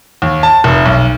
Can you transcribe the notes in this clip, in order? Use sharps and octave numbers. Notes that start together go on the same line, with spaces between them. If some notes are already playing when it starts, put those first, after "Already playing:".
D#2
A5
F1
B1